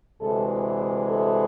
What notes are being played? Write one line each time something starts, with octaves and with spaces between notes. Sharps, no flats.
D2 C3 E3 G#3 A4
A4